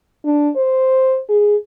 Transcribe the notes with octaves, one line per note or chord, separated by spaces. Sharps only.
D4
C5
G#4